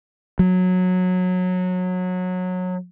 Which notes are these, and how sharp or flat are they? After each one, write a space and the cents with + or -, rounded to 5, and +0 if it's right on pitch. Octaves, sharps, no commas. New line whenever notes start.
F#3 -20